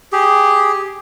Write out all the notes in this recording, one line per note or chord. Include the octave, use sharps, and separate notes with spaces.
G4 G#4